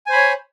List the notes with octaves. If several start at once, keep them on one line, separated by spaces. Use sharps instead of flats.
C5 C#5 G#5 B5